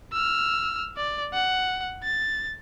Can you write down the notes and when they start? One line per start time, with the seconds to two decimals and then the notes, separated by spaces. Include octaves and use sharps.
0.13 E6 F6
0.97 D5
1.34 F#5
2.04 A6